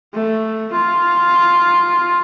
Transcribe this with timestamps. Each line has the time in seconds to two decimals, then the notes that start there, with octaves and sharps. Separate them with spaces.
0.14 A3
0.72 F4